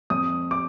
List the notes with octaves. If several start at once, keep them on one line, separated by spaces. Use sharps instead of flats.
F2 D#6
D6